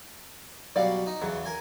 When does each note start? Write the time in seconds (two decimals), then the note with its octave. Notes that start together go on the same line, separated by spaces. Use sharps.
0.76 B2 F#3 G3 D5 F5
1.06 D#4
1.22 E2 C#3 F#3
1.45 A#4 G#5